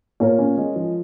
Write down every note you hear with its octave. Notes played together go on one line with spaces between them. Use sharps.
A#2 A#4 C#5
C#4
G#3
F3